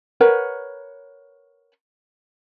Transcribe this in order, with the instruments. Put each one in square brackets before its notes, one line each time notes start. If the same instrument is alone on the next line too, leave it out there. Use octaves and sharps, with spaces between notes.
[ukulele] A#4 B4 C#5 F#5